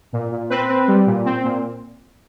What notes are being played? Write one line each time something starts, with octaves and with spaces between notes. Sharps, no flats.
A#2
A#2
C4 B4
C4
G3
A#2
C4
A#2